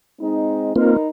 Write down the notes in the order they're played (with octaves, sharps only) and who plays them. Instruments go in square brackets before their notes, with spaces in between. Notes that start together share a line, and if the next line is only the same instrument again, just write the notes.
[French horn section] G#3 C4 D#4
[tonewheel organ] A#3 C4 F4 [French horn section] D#4 A#4 B4